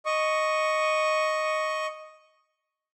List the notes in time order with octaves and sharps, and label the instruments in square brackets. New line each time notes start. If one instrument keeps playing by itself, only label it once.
[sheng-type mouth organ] D#5 C#6